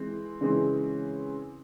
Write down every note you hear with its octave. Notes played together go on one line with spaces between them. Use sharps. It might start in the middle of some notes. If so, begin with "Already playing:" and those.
Already playing: E3 G#3 C4
C#3 E3 G#3 C4